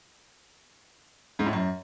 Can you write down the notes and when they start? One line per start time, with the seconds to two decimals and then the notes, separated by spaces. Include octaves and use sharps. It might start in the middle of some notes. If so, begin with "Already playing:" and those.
1.39 G#2
1.46 A2
1.53 F#2